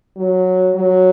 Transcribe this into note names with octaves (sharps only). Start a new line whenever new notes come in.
F#3
F#3